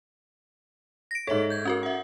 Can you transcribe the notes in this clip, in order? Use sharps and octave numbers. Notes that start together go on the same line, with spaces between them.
A#6 D7
G#2 A4 C#5 E5
G6 G#6
C#4 F#4 A#4
E5 F#5